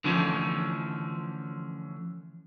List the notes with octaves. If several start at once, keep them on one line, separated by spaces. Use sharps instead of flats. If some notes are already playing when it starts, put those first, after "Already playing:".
D3 E3 F3 A3 C#4